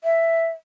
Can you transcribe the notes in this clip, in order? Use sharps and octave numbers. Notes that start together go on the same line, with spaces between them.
E5